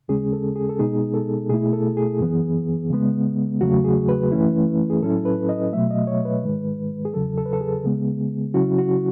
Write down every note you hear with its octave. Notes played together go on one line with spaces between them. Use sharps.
D#2 C#3 G#3 C#4 G#4
A4
G#4
A4
B2 G#3 B3 D#4 G#4
A4
B2 A3 E4 G#4
A4
G#4
F#2 E3 B3
C#3 G#3 B3
E2 C#3 F#3 A3 F#4
G#4
B4
F#2 E3 A3 C#4 E4
G#4
A2 F#3 C#4 E4 A4
B4
D#5
B2 F#3 A3 E5
D#5
C#5
B4
G#2 D#3 G#3
G#4
E2 C#3 F#3 A4
A4
B4
A4
G#4
C#3 G#3 B3
C#3 F#3 C#4 E4 F#4
F#4